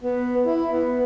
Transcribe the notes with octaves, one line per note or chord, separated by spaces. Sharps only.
B3
E4
B3